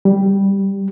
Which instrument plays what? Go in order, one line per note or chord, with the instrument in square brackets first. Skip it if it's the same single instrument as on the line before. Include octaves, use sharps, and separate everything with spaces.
[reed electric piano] G3